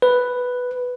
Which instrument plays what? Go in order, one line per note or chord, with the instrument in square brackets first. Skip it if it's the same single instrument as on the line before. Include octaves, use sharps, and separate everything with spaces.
[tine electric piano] B4